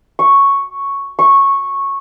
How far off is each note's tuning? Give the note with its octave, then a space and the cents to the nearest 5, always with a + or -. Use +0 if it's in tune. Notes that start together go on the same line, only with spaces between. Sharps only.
C#6 +0
C#6 -10